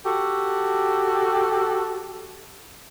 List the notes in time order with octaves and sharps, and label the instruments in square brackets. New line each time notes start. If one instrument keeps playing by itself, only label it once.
[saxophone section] F#4 G4 A4